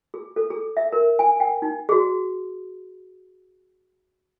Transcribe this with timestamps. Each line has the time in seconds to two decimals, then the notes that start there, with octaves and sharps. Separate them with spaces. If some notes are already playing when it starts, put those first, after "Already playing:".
0.14 G#4
0.36 A4
0.50 G#4
0.77 E5
0.93 A#4
1.19 G#5
1.40 G5
1.62 D#4
1.89 F#4 G#4